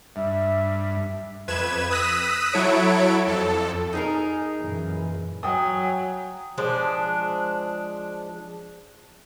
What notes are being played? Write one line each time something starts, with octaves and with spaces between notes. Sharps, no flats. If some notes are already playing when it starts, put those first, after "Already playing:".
G2 E5
F2 B4 G#6 E7
D#6 E6 F#6 A#6 B6 D#7
F#3 E4 A4 C#5 D7
F2 A4
D#4 G#4 A#4
F#2 A#2 E3
F#3 G5 G#5 D#6
F3 G#3 D4